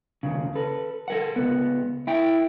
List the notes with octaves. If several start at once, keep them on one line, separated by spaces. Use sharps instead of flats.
D#2 C#3
A4 B4
A4 A#4 F#5
C#2 F#2 B3
E4 G5